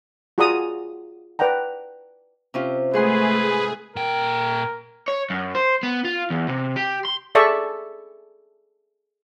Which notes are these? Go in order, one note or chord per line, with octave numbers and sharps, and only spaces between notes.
F4 F#4 G#4 D5 A#5 D#6
B4 D5 F#5 G5 A#5
C3 C#4 F4
G#2 A3 G#4 B4 F#5 C6
A#2 A#4 G5
C#5
F#2
C5
B3
F4
E2
C3
G4
C6
G#4 A4 D5 E5 A5 C#6